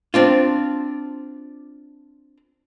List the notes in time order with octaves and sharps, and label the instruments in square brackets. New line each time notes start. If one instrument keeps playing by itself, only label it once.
[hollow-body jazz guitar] C4 D4 F4